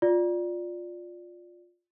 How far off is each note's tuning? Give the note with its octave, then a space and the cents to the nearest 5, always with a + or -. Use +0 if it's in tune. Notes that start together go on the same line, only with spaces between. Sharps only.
F4 +10 D5 +0